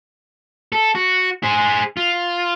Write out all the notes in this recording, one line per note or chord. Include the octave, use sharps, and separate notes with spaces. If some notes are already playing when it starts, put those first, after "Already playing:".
A4
F#4
G#4 C5
F4